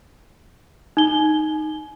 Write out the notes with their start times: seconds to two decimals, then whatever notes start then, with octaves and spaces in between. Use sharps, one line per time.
0.97 D#4 G7